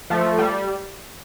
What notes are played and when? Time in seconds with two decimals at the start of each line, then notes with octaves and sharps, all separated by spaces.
0.10 F3 A3
0.38 G3